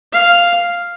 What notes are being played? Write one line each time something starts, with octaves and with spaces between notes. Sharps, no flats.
F5